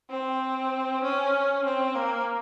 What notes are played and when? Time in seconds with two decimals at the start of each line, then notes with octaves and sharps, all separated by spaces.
0.10 C4
1.03 C#4
1.65 C4
1.96 A#3